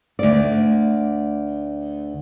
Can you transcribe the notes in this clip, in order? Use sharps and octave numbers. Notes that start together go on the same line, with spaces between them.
D2 D5